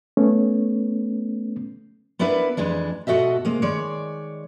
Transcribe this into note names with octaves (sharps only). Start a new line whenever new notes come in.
A3 B3 C#4
B3 D4 E4 A#4 B4
F2 E3 G#3 D4
G#2 B2 F#4 A4 D#5 E5
C3 G#3 A#3
D#3 G#3 C#5 D5